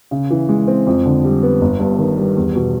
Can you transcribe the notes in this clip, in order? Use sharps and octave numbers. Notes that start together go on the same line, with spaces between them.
C#3
E3
G#3
C4
F2
D3
G3
B3
G1
G2
D#3
G3
E2
B2